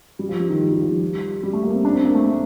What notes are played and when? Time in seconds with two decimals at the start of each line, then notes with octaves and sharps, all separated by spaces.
0.19 G3
0.29 F3
0.40 G3
0.50 D#3
0.60 F3
0.71 G3
0.81 F3
0.91 G3
1.43 G3
1.53 A3
1.63 A#3
1.74 C4
1.85 D4
1.94 C4
2.05 A#3
2.15 A3
2.25 A3